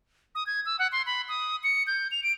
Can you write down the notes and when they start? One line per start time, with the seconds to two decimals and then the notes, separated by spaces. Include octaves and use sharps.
0.35 D#6
0.47 G#6
0.66 E6
0.79 F#5
0.92 C6
1.06 B5
1.29 D#6
1.63 C#7
1.87 G6
2.11 F7
2.23 D7